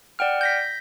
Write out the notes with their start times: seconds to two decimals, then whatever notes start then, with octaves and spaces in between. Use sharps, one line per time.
0.19 D5 F#5 G5 F6
0.41 G6 A#6 B6